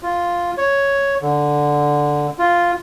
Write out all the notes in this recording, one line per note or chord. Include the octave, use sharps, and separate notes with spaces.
F4
C#5
D3
F4